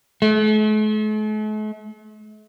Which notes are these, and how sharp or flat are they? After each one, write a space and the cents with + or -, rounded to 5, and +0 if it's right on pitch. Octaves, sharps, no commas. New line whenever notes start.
A3 -45